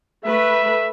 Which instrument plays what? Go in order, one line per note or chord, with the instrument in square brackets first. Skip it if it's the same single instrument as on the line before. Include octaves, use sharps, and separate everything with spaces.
[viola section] A3 B4 [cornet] E5